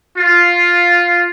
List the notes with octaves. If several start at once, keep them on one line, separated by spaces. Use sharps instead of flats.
F4